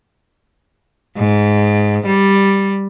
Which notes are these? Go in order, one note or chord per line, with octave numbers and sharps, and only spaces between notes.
G#2
G3